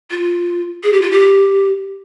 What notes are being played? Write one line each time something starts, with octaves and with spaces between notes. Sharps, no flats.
F4
G#4
G4
F4
G4